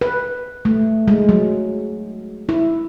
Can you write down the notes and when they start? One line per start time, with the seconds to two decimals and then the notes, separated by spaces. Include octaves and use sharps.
0.01 B4
0.65 A3
1.08 G#3
1.29 F#3
2.49 E4